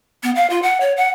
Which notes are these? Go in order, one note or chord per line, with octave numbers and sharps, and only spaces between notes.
B3
F5
F4
F#5
C#5
F#5